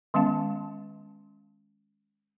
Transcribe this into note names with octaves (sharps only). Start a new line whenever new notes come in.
D#3 G#3 B3 C#4 F5 A5